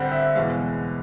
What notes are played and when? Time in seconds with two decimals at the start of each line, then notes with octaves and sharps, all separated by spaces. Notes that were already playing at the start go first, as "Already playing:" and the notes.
Already playing: G2 D3 G3 C4 F#5
0.12 E5
0.35 E2 B2 G#3 F5